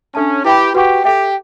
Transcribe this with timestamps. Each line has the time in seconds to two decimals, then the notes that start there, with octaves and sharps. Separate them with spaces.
0.15 C#4 D4 A4 E5 A5
0.44 E4 G4 B4 E5 G5 B5
0.74 F#4 G4 B4 F#5 C#6
1.04 G4 A4 E5 G5